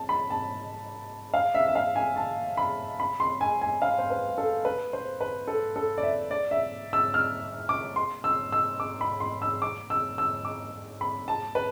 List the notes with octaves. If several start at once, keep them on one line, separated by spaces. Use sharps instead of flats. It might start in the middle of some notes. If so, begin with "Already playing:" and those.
Already playing: A5
B5
A5
F5
E5
E5
F5
G#5
A5
B5
B5
C6
G#5
G#5
F5
C5
B4
A4
B4
C5
B4
A4
A4
D5
E5
D5
E5
E6
F6
D6
C6
E6
E6
D6
B5
C6
E6
D6
E6
E6
D6
B5
A5
B4